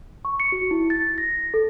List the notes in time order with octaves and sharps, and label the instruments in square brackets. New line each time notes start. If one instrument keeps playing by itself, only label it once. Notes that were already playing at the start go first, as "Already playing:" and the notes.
[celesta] C#6
C#7
F#4
E4
A6
A#6
A4